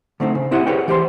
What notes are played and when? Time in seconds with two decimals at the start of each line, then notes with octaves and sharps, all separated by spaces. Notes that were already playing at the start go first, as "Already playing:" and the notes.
0.20 D3 A3 C4 D#4
0.35 C#3
0.51 C4 E4 G4 D#5 F#5
0.66 G4 G#4 B4 C#5 D5 G5
0.88 E3 G4 C5 F#5 C6